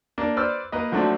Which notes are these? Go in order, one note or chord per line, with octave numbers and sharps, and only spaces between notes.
A#3 D4
B4 C5 D5 E6 F6
A#3 B4 D#5
D3 F3 F#3 A3 C4 D4